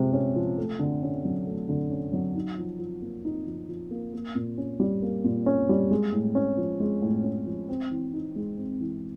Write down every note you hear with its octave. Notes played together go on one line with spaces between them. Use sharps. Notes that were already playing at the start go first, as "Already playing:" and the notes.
Already playing: C3 F3 G#3
C#4
F3
A3
D3
C#4
F#3
A3
D3
C#4
F#3
D#4
F3
F3
A#3
D#4
F3
F3
A#3
A#3
A#2
C#4
G3
A#3
A#2
C#4
G3
G#3
A2
C#4
F3
G#3
A2
C#4
F3
C4
E3
D#4
G#3
C4
E3